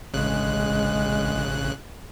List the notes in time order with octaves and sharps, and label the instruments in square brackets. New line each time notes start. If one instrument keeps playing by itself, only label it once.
[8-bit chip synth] A1 C#3 F#6 [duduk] G#3